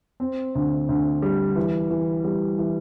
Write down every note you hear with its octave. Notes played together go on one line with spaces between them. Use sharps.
C4
D2
D2
G3
E3
E3
G3
E3